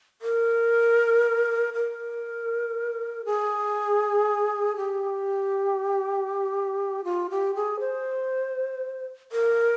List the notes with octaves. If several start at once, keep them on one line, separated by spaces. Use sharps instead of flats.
A#4
A#4
G#4
G4
F4
G4
G#4
C5
A#4